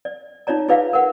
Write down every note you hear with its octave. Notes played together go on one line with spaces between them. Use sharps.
D5
D#4 F4 C#5 D5 A#5
F4 G#4 B4 D5 E5 F5
A#4 B4 F#5